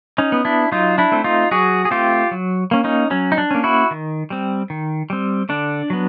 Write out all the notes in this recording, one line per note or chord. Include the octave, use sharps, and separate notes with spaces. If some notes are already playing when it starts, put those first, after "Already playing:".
C#4 D#4
B3
D4 E4
F#3 D#4 F4
D4 E4
A3 C4
D#4 F4
F#3 F#4 G#4
G#4
A3 C4 F4 G4
F#3
A#3 C#4
C#4 D#4
F#3 C#4
D#4
D4
A#3 C#4
E4 F#4
D#3
G3 C4
D#3
G3 C4
D3 D4
F#3 B3